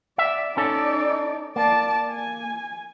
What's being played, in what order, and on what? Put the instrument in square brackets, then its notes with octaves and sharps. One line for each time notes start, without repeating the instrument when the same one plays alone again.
[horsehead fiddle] D5 [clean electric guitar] E5
[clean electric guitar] C#4 A4 [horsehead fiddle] D#4 D5
[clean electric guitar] A#3 [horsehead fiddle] D5 A5
[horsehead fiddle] G#5